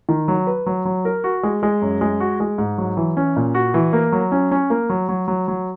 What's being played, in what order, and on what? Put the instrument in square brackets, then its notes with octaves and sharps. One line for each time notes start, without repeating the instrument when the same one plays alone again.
[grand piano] D#3
F#3
B4
F#3
F#3
A#4
F#4
G#3
G#3
F#2
G#3
F#4
G#3
G#2
F#3
E3
C#4
A#2
F#4
E3
A#3
F#3
C#4
C#4
A#3
F#3
F#3
F#3
F#3